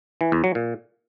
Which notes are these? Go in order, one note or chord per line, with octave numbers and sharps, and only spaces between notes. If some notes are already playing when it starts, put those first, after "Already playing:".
E3
E2
F#3
A#2